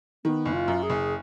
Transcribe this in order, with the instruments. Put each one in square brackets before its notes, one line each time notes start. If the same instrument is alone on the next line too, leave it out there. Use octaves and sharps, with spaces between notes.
[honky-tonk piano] D#3 [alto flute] B3
[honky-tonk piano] F#1
[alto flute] F4
[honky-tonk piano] F#2
[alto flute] G#4
[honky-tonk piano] F#1